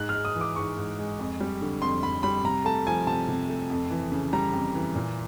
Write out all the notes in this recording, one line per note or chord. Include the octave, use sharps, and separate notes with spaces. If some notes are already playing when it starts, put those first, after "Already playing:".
Already playing: G#2 F#6
F6
G#3
D#6
E3
D6
G#2 C#6
G#2
G#3
F2
G3
D3
F2 C6
F2 B5
G3 B5
C3 A#5
A3 A5
F3 G#5
C3 A5
C3
A3
F2
E3
C#3
G3 A#5
F2
E3
A#2